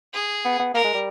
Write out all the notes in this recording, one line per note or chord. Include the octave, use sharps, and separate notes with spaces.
G#4
B3
B3
A#3 A#4
G#3
G3